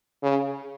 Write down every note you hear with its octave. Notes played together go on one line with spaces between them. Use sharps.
C#3